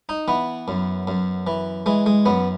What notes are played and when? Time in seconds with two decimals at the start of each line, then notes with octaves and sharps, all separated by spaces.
0.09 D#4
0.28 E3 B3
0.68 F#2
1.07 F#2
1.47 E3
1.86 E3 G#3
2.06 G#3
2.26 F#2 B3